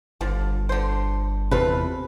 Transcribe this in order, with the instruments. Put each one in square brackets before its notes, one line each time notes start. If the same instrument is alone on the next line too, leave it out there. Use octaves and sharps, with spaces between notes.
[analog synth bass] G1 [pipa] D3 F3
[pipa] D3 C5
[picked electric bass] E2 C3 [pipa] F4 A4 B4